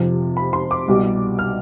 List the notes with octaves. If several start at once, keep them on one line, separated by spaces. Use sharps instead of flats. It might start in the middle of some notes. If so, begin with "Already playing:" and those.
Already playing: F2 C3 F3
B5
C6
D6
C2 B2 G3
F6